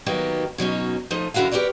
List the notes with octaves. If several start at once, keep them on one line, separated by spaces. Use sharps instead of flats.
D#3 F#3 A#3 B3 D#4 G4
B2 F#3 C#4 D#4
F3 A3 D#4
F#2 D3 E4 F#4 A#4 F5
G4 A#4 B4 C#5 D5